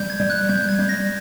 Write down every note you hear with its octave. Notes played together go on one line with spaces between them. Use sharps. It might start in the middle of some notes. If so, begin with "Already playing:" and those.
Already playing: G3 G6
G#6
G3
F#6
G3 G6
G#6
G3
A#6